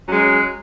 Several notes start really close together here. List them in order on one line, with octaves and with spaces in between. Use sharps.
F#3 C#4 G#3